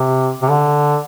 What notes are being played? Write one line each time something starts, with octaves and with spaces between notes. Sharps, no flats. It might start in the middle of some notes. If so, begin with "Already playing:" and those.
Already playing: C3
C3
D3